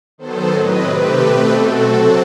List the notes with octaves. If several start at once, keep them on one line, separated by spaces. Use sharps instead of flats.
D#3 F#3 B3 A4 C5
A2 F#3 C4 B4 D#5
C3 D#3 A3 C4 G4 B4
B2 A3 C4
B2 A3 C4 F#4 A4
C3 F#3 C4